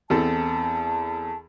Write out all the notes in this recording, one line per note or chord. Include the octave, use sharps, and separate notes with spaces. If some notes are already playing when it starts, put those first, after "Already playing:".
E2 C4 A4 A5